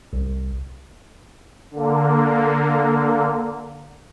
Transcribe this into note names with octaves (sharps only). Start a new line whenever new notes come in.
C2
D3 A#3